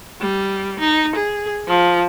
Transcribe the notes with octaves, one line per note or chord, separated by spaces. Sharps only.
G3
D#4
G#4
F3